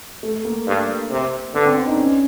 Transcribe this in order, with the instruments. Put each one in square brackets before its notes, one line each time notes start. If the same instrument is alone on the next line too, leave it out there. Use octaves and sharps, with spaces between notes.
[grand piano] A3
A#3
[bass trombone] G2
C3
[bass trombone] D3 [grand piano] B3
[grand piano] C4
D4
D#4
C#4